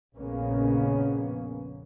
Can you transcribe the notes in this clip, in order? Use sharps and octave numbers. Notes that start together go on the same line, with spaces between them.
A#1 F2 C#3 A#3 B3 C#4